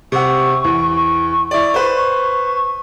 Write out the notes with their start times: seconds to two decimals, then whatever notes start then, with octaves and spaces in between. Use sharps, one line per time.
0.12 C3 F#5 C#6
0.64 E2 E3
1.51 E4 D5 C#6
1.74 B4 C5
1.96 C#6